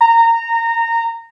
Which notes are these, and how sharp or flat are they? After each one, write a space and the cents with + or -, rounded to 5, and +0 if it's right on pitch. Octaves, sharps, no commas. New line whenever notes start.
A#5 -20